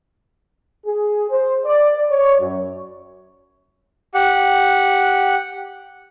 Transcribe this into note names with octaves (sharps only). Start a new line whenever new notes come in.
G#4
C5
D5
C#5
F#2
G4 F#5